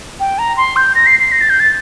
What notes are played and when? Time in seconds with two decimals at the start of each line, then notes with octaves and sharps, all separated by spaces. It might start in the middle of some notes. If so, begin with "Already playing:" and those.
0.20 G5
0.39 A#5
0.57 C6
0.76 G6
0.95 A#6
1.06 C7
1.20 C7
1.32 A#6
1.41 A6
1.50 G6
1.60 A6